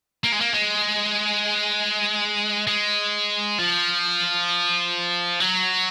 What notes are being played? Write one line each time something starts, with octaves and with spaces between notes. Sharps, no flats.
A#3
G#3
A#3
G#3
G#3
F3
F#3